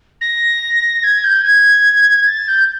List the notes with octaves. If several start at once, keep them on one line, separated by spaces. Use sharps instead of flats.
A#6
G#6
G6
G#6
A6
G6